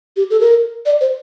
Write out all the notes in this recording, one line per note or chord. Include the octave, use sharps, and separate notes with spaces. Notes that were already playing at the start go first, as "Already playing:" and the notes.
G4
A4
A#4
D5
C5